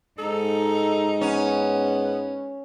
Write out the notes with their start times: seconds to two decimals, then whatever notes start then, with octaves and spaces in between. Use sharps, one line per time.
0.18 G#2 D#4 A4
1.21 B3 C#4